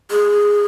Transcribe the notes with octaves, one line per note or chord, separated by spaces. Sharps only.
G#4